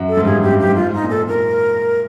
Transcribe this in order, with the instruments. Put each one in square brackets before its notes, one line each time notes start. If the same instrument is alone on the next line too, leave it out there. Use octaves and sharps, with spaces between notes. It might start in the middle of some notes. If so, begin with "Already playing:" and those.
Already playing: [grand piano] F#2
[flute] A4
[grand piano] G#2
[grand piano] G2 [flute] G#4
[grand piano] F#2
[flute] G4
[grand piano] G2
[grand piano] G#2 [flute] G4
[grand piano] G#2 [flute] F4
[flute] D#4
[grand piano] A#2
[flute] A4
[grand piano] A#2 [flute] A#4